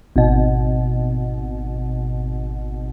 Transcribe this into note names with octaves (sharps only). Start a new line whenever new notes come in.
G#1 B2